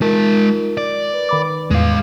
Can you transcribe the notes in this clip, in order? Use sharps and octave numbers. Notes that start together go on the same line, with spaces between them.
G#3 D#4 F4 A#4 A5
D5
B4
D#3 B5 D6
E2 A2 G#3 F5